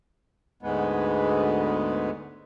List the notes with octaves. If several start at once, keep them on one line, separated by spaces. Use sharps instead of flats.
D2 G#2 G#3 B3